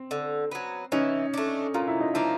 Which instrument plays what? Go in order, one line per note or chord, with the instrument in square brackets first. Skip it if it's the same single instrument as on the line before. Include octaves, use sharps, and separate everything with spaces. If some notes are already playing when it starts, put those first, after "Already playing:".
Already playing: [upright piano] C4
[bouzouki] D3
F#3 B3
[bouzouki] E3 [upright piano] C#4 D#4
[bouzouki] A3 D4
[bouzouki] A#2 [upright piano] F4
[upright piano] E4
D#4
[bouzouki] F3 A#3 [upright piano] D4 E4